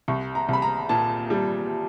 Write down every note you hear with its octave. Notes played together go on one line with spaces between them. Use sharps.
C2 C#6
A#5
C2 B5
A#5
A#2 A5
G3